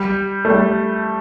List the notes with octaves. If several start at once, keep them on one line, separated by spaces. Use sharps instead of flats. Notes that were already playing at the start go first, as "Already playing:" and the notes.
Already playing: G3
A3
G3